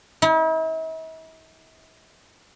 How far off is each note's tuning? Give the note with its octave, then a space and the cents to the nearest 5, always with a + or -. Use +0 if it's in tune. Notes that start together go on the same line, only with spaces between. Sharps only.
E4 -45